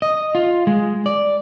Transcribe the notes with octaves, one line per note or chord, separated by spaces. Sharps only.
D#5
F4
G#3
D5